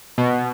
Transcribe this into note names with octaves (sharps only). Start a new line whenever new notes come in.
B2